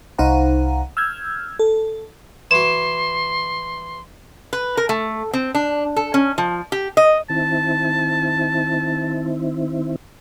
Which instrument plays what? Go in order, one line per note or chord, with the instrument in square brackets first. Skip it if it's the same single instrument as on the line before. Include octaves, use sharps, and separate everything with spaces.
[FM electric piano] C2 D#4 C5 F5 F#5 A#5
E6 F6 G6 G#6
A4
[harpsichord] E3 F#4 [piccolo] C6 [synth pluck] E7
[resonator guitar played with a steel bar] B4
A#4
A3
C4
D4
A4
C#4
F3
G4
D#5
[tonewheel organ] D#3 C4 E4 [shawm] A5